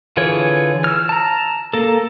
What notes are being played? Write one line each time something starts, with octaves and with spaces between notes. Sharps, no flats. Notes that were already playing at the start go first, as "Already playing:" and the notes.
D3 E3 F4 G#4 C#5
E6 F6
A5 A#5
A#3 A4